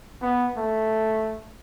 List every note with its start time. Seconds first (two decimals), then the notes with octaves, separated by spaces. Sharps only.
0.22 B3
0.57 A3